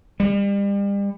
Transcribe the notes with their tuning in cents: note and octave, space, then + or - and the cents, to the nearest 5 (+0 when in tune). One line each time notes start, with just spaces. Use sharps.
G3 +35